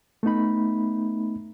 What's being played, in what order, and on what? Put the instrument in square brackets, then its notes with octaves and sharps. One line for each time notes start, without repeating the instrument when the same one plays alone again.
[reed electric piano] A3 B3 D#4 B5